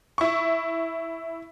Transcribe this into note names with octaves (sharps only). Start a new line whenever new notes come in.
E4 C#6